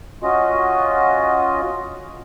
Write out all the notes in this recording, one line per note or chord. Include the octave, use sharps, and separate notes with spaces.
C#4 F4 F#4 D#5